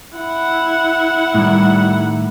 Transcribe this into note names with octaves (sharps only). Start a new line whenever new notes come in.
E4 F#5
A2 D#3 G3